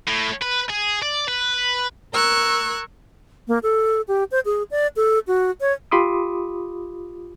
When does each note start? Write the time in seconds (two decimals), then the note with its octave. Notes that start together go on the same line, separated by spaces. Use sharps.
0.08 A2
0.42 B4
0.70 G#4
1.02 D5
1.28 B4
2.13 A#4 C#6 E6 F#6 G#6
3.48 A#3
3.63 A4
4.08 G4
4.31 C5
4.45 G#4
4.71 D5
4.96 A4
5.27 F#4
5.61 C#5
5.91 F4 G4 B5 C6 D6 D#6